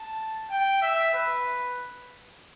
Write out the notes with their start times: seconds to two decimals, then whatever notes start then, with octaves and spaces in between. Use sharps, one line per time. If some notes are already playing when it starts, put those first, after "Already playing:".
Already playing: A5
0.50 G5
0.81 E5
1.14 B4